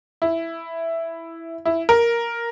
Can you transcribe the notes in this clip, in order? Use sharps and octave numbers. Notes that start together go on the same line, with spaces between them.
E4
E4
A#4